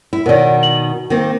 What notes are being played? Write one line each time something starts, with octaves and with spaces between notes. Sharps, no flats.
E4
B2 D#3 A#4 C#5 D5
F#7
D#3 A#3 C4